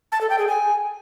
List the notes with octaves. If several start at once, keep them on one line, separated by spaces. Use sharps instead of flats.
A5
A4
G5
G#4
G#5